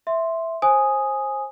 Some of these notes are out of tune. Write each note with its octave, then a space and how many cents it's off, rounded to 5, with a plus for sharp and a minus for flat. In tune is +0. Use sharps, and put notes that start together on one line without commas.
E5 +0 C6 +0
C5 +25 G#5 +0 D#6 +0